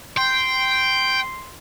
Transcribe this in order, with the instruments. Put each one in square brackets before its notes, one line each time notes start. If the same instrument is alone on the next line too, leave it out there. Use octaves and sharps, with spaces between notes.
[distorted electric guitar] G5 [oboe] C6